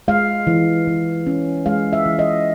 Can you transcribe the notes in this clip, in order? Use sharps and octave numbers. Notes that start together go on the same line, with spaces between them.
G#3 F5
E3
E3
C#4
G#3 F5
E5
E3
D#5